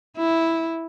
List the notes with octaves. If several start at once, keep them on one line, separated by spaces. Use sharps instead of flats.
E4